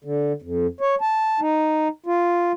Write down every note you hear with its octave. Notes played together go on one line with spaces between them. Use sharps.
D3
F2
C#5
A5
D#4
F4